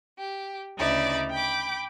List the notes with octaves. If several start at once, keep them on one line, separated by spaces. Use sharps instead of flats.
G4
D2 C#3 D#4 E4 D5
G5 B5 D6